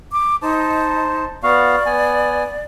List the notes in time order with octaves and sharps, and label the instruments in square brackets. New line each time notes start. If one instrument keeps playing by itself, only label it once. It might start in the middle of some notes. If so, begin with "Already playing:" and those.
[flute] D6
[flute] D#4 [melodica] C5 A5
[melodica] B3 F#4 F5 [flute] D5
[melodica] B3 G#5